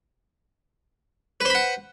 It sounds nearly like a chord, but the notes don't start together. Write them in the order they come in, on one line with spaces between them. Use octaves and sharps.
B4 C5 B5 F#5